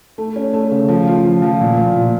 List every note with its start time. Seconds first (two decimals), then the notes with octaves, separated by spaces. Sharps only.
0.18 A3
0.36 C#4
0.53 A3
0.71 C#3
0.88 F3
1.07 F4
1.25 F3
1.42 F3
1.61 A#2
1.77 A#2
1.96 A#2